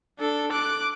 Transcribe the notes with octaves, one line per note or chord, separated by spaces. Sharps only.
D4 A4
D6 F#6